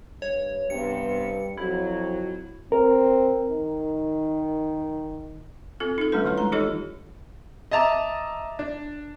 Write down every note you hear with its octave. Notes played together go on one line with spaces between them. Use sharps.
G2 C#5
G2 C3 G3 B3 C#7
F2 F#3 E4
C4 A#4
D#3
C4 F4 A4
D#4 A4
G3 A3 C#4 D4 F4 B4
D#3 E3 A3 E4 B4
G#3 A#5
D#4 F4 G4 A4 C#5 D#5
D#5 E5 A5 A#5 D6
D4